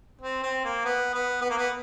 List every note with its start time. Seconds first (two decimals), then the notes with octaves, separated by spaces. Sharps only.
0.21 C4
0.43 C4
0.64 A#3
0.85 B3
1.14 B3
1.41 B3
1.50 A#3
1.57 B3